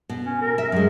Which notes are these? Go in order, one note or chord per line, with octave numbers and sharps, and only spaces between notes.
B2
C#4
A#4
E5
F#2 G#3